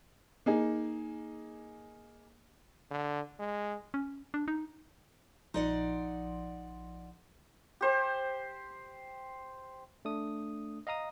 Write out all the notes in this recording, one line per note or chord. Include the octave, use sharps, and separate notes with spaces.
A#3 D#4 G#4
D3
G#3
C#4
D4
D#4
A#1 F3 D#4 D5 F#5 C6
G4 C5
A3 D4 D#6
D#5 F5 A#5 D#6